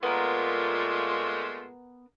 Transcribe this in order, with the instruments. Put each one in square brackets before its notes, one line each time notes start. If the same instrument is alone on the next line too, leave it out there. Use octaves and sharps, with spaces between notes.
[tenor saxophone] A#2 [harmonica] G#3 A3 F4 [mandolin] B3 A#4